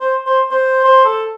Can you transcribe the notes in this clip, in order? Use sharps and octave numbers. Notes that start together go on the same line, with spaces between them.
C5
C5
C5
C5
A4